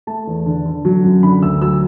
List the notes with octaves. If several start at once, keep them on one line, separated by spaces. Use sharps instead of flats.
A3 A5
E2
D3
D3
F#3
F#2
D3 B5
D2 E6
F#3 E6